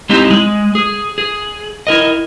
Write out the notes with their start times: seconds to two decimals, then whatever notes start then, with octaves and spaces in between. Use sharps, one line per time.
0.09 G#3 C4 D#4 E4 G4
0.31 G#3
0.75 G#4
1.18 G#4
1.87 E4 A#4 D#5